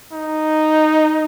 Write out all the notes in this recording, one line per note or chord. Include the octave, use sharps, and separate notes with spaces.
D#4